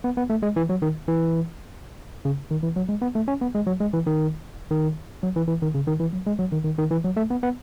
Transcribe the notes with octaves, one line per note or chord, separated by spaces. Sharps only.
B3
B3
A3
G#3
E3
F#3
D#3
E3
C#3
D#3
E3
F#3
G#3
B3
A3
C#4
B3
G#3
F#3
G#3
E3
D#3
D#3
F#3
E3
E3
D#3
C#3
D#3
E3
F#3
G#3
F#3
D#3
D#3
D#3
E3
F#3
A3
B3
B3